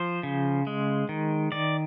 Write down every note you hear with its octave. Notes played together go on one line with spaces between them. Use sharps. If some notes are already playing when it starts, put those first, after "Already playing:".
Already playing: F3 C5
C#3
G#3
D#3
D#3 D5